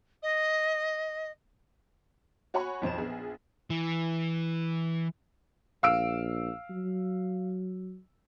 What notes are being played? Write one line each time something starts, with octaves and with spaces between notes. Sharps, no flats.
D#5
F#4 C#5 F#5 G#5 B5 C#6
B1 F2 C5 E7
A#1 B3 G#4
E3
A#1 F5 E6 D7
F#3